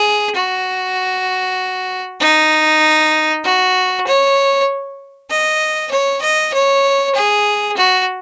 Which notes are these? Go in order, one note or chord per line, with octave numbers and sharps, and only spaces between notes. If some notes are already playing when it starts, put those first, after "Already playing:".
Already playing: G#4
F#4
D#4
F#4
C#5
D#5
C#5
D#5
C#5
G#4
F#4